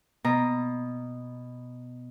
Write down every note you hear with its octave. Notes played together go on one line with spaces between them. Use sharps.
B2 A#5